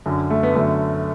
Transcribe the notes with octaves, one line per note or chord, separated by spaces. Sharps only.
F#2 D3
A3
B3
F#2 D3 A3